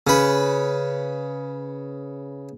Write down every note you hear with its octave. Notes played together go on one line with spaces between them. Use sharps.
C#3 B4